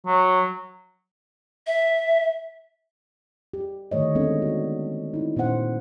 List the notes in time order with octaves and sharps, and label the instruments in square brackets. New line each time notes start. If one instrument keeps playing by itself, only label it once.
[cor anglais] F#3
[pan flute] E5
[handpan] G4
D3 D#3 A3 C#5 D#5
G#3 B3 C4 D4 A4 D#5
F#4
D#4 E4
A#2 B3 C#4 C5 F#5